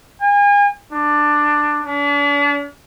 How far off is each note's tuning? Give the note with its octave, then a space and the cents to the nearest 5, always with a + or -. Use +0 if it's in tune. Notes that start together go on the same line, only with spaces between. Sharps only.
G#5 -35
D4 +10
D4 -40